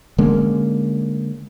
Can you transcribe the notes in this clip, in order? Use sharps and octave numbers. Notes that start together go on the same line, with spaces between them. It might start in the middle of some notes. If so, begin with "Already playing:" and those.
D3 G#3 A#3 C#4